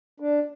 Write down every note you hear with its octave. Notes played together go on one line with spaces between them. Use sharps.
D4